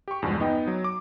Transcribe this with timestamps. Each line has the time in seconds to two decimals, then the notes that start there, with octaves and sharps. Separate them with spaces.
0.08 G4 C#6
0.22 E2 G2 B2 F3 G#3
0.40 B3 D#4 D#5 G5
0.67 F#3
0.84 D6